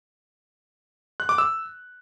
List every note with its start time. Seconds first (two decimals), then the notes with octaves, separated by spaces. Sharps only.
1.20 F#6
1.29 D6
1.38 E6